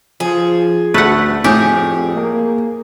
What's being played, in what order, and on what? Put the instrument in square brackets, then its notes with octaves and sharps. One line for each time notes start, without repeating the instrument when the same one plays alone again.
[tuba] F3 [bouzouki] G#4
[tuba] D2 [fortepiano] A3 [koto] B4 F#5
[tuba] F2 [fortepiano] A2 [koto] G4 [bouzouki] G#4
[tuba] A#3